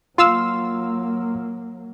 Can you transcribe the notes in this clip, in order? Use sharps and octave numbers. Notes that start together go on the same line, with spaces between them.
F#3 A#3 F4 F5 C6 E6